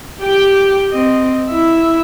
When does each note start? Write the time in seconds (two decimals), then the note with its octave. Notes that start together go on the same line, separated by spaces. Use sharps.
0.21 G4 G5
0.92 C4 D#5
1.50 E4 E5